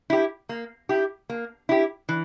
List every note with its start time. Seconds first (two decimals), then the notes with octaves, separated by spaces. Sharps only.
0.10 E4 G4
0.49 A#3
0.89 E4 G4
1.30 A#3
1.69 E4 G4
2.09 E3